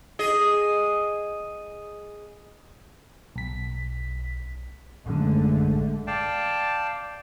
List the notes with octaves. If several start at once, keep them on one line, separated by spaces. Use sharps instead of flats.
G#4 D#5
B1 B6
A1 F#2 D3 G#3 A3
D5 F5 G5 A5